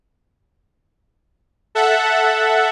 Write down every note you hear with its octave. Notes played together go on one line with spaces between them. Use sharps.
A4 E5 F#5